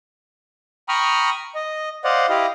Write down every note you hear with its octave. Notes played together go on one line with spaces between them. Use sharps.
G5 A#5 B5 C#6 D#6 F6
D#5
C5 D5 D#5 F5 F#5
E4 G4 D#5 F5